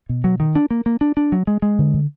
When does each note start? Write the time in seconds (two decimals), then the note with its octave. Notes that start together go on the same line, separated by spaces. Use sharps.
0.09 B2
0.24 F#3
0.40 D#3
0.56 D4
0.71 A#3
0.86 A#3
1.01 D4
1.17 D4
1.32 F#3
1.47 G#3
1.62 G#3
1.79 D3
1.94 D3